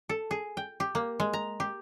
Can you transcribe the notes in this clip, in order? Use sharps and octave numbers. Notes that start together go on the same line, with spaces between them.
A4
G#4
G5
G4
A#3
G#3
A#5
G4